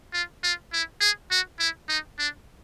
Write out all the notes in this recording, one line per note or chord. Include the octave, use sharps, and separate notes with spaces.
F4
F4
E4
G#4
F#4
E4
D#4
D4